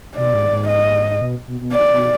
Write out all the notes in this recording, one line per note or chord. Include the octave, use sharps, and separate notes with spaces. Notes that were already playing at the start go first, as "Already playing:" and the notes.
B2 D5
G#2
G#2
D#5
B2
B2
B2
D5
B2